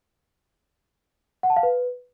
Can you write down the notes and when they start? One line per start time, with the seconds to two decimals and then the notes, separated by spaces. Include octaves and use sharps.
1.43 F#5
1.50 A5
1.57 F5
1.63 B4